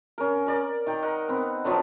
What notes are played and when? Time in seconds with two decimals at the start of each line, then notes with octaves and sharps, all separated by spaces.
0.18 C#4 A#4
0.46 A#4 D5
0.86 D#3 G5 A#5
1.02 A#4 D#5 F#5
1.29 B3 C4
1.65 D3 F3 F#3 B3